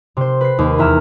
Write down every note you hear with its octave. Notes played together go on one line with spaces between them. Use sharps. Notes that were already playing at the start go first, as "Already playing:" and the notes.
C3 C5
B4 C7
D#2
E2 E5 A#5 F6 E7